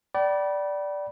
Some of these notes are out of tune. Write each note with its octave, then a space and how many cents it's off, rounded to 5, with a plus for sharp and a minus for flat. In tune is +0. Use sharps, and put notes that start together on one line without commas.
D5 -5 G5 -40 B5 -25